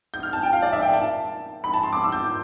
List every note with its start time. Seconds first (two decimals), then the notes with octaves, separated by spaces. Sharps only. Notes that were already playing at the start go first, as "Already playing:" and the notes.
0.14 G6
0.23 F6
0.33 A5
0.43 G5
0.53 F5
0.62 D5
0.73 E5
0.82 G5
0.93 A5
1.64 B5
1.74 A5
1.83 C6
1.93 D6
2.04 E6
2.12 G6